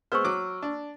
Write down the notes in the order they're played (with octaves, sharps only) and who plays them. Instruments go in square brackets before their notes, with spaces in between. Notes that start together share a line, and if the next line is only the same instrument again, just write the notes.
[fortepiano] G#3 B3 C5 [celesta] C#6 E6 F6
[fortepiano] F#3 D6
D4